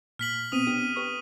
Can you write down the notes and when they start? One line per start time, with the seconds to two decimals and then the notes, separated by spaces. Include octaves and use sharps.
0.19 A#2 F6 B6 F#7
0.52 B2 B3 C4 D#6 D#7
0.67 B3 D4 G4
0.96 G4 B4 C#6